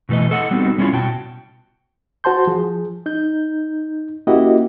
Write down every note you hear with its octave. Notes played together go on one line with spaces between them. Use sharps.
B2 E3 A3 B4 D#5
A4 D#5 F#5
G3 B3 C4 D#4 F#4 A4
G3 C4 C#4 E4 F4 C#5
B2 F#4 G5 A5
F#4 C5 A5 C6 G6
F3 G#4
D#4 G6
A#3 C#4 E4 F#4 G4 D#5